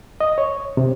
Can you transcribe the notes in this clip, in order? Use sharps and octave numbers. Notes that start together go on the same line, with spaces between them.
D#5
C#5
C3